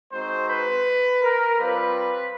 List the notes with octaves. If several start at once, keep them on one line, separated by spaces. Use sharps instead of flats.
G#3 C4 D#4 F#4 C5
B4
A#4
G3 C4 F4 B4